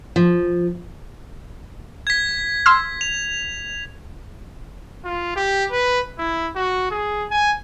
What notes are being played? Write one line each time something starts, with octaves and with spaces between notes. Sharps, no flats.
F3
G#6 B6
C6 E6 F6
F7
F4
G4
B4
E4
F#4
G#4
G#5